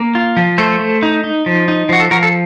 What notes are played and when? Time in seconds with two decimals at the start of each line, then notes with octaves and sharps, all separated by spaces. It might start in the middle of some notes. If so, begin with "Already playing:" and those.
Already playing: A#3
0.15 F4
0.37 F3
0.58 A3 A4 C5
0.80 A3
1.03 D#4
1.24 D#4
1.46 F3
1.68 D#4
1.89 F3 F#4
2.00 A4
2.11 F3 F#4 A#4
2.23 A4